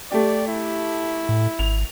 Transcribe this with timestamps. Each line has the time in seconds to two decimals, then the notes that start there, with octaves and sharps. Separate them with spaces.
0.11 A3 G4 D5
0.48 E4
1.29 A2
1.59 G#1 F7